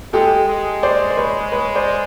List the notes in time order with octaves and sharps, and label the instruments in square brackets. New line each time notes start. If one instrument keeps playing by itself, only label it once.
[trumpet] G#3 [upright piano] G4 A4
[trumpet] G#3
[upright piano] C5 D5
C5
B4 C#5
B4 C#5
C5 D5